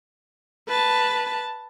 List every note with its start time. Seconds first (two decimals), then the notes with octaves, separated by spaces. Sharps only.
0.69 B4 A5